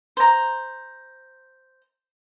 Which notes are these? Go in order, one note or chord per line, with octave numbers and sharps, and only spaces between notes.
C5 A#5